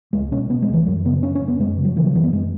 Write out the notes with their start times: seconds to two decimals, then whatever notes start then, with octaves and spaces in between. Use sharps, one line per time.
0.13 C#2 G#3
0.31 B2 C#4
0.50 B2 B3
0.62 G#3
0.69 C#2
0.74 E3
0.86 F#2 F#3
1.05 C#3 B3
1.22 C#3 C#4
1.35 C#4
1.41 F#2
1.48 B3
1.59 F#2 G#3
1.77 C#3
1.85 F#3
1.96 C#3 E3
2.06 F#3
2.15 F#2 E3
2.24 B3
2.32 F#2 G#3